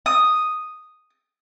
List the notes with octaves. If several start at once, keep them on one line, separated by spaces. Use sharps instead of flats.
D#6